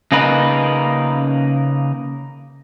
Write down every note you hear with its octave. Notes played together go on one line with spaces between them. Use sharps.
C#3 A#3 D#4 B4